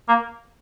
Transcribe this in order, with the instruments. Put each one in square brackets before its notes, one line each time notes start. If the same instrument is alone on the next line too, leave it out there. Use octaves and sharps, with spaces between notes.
[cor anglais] A#3